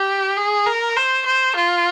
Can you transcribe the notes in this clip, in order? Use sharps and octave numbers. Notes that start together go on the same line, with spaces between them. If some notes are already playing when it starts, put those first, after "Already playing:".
Already playing: G4
G#4
A#4
C5
C5
F4